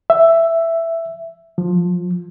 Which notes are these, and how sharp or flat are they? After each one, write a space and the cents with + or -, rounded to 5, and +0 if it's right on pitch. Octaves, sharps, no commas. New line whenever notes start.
E5 +5
F3 +15